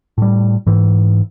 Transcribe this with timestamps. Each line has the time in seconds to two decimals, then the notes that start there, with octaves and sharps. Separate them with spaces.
0.18 A2 G3
0.67 G#2 E3